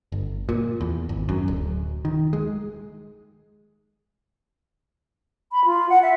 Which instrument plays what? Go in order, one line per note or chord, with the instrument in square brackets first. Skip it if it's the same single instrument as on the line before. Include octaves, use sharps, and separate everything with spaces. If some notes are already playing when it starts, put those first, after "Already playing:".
[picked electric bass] G1
A#2
E2
G#1
F#2
D1
D#3
G#3
[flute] B5
F4
F#5
E5